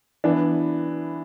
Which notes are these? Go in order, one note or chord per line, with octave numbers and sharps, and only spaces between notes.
E3 B3 D4